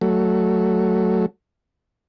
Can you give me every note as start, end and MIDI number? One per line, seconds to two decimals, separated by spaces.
0.01 1.26 54
0.01 1.26 57